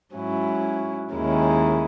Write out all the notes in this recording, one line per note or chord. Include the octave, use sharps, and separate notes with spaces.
G#2 F#3 C#4 E4
D#2 D#3 G#3 C#4 E4